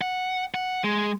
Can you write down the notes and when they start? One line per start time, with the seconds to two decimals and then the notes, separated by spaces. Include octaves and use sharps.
0.01 F#5
0.54 F#5
0.84 G#3